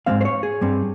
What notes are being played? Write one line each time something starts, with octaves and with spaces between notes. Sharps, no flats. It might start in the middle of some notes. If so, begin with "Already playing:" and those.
G#2 F3 G#3 C4 F5
C5
C#5
G#4
G2 G3 C4